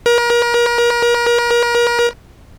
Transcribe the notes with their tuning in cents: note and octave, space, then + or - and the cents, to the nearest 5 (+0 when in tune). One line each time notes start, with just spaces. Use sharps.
A#4 +35